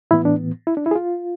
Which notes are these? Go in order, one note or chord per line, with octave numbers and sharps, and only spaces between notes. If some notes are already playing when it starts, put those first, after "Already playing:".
A2 E3 B3 E4
D4
E4
D4
E4
G#4
F4